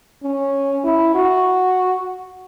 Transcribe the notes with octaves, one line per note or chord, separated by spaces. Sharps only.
C#4
E4
F#4